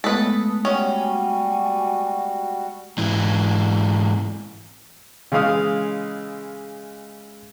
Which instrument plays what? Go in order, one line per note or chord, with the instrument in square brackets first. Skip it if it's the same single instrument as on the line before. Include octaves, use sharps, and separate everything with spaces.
[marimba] G#3 A3 B3 [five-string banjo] A4 B4 [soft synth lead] D#6
[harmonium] G3 F#4 [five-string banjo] C#4 [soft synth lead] G#5
[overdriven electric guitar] G#2 E3
[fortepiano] C#3 E3 G#3 F5 D#6 F6